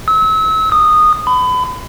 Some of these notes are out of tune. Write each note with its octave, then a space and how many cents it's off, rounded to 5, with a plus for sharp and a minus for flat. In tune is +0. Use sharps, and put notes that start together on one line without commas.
E6 -35
D#6 -15
B5 +30